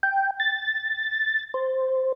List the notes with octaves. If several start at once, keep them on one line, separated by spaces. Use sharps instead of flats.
G5
A6
C5